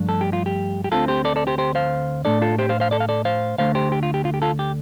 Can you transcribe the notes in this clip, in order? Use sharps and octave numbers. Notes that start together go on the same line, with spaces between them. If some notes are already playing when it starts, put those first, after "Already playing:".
Already playing: G2 F3 A3 D4
A4
G4
F4
G4
G4
D2 D3 A3 C4 F4 A4
G4 C5
A4 D5
A4 D5
G4 C5
G4 C5
C5 F5
A2 A3 D4 A4 D5
F4 A4
G4 C5
C5 F5
C5 F5
A4 D5
F5
A4 D5
C5 F5
D2 D3 A3 C5 F5
G4 C5
G4
F4
G4
F4
G4
F4 A4
G4